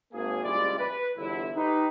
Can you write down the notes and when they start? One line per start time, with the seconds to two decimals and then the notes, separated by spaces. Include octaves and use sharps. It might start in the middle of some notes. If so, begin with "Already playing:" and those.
0.12 G#1 A#3 G#4
0.43 A#1 C#3 G3 G#3 E4 D5
0.78 B4
1.16 G1 E2 D3 E4
1.55 D#4 G4 B4